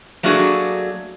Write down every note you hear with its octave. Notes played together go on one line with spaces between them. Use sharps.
F#3 A3 A#3 D4 F#4 G#4